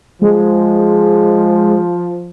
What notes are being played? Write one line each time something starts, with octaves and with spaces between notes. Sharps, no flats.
F3 G#3